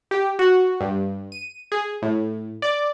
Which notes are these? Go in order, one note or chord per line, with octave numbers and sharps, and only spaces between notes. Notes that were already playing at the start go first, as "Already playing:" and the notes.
G4
F#4
G2
D#7
G#4
A2
D5